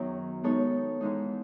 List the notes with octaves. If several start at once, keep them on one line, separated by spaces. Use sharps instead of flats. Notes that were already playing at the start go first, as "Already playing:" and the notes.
Already playing: F#2 D#3 F#3 B3 D#4 G#4 C#5
G#3 B3 D#4 A4 C#5
G#2 E3 G#3 D#4